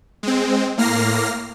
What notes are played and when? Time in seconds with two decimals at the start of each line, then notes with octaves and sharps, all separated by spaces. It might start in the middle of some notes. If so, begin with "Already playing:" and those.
0.23 G#3 C4
0.77 A2 A#3 F6 A#6 C7